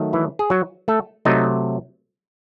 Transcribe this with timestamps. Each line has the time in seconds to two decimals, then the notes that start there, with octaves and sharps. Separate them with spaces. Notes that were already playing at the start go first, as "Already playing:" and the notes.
Already playing: D#3 F#3 A3
0.13 E3 E4
0.39 G#4
0.50 F#3 F#4
0.88 A3 A4
1.25 C3 F#3 A3 D#4 D#5